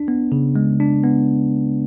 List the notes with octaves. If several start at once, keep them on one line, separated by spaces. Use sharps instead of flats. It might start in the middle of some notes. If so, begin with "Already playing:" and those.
Already playing: D4
B3
C#3
G#3
D4
B3